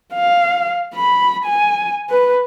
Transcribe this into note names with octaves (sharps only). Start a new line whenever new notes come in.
F5
B5
G#5
B4